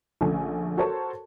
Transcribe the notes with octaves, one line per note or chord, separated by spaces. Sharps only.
A#1 D3 A3 C#4 G#5
F#4 A4 A#4 C5 C#5 A5